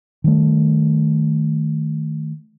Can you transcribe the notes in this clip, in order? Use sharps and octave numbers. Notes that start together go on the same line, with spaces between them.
D#3 G3 A3